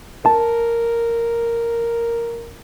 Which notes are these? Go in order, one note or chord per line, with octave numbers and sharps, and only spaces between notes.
A#4 A5